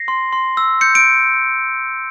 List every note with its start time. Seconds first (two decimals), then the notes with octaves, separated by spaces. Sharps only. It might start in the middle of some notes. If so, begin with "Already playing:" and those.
Already playing: A#6 C7
0.08 C6
0.33 C6
0.57 E6
0.81 G6 C#7
0.95 D7